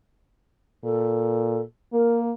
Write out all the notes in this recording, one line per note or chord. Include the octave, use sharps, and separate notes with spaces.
A#2 A4
A#3 A#4